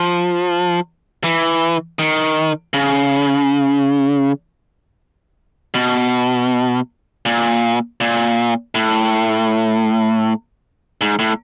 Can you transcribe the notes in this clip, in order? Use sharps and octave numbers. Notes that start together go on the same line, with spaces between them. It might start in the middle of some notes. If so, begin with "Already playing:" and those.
Already playing: F3
E3
D#3
C#3
B2
A#2
A#2
A2
G#2
A2